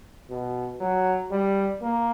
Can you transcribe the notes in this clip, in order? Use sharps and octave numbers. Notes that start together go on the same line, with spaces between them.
B2
F#3
G3
A#3